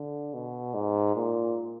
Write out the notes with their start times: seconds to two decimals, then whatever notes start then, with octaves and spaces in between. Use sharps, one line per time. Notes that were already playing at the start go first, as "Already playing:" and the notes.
Already playing: D3
0.34 B2
0.74 G#2
1.16 A#2